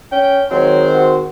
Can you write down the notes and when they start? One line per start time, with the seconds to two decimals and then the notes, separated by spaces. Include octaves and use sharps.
0.12 C#4 G5
0.51 D#3 F#3 G#3 C4 C5
0.95 F#4